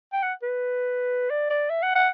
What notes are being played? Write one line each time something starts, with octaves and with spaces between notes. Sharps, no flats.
G5
F#5
B4
D5
D5
E5
F#5
F#5